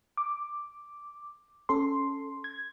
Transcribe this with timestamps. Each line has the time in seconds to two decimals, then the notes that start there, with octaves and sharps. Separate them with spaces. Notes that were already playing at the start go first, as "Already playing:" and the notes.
0.17 D6
1.69 C#4 A4 C6
2.44 G#6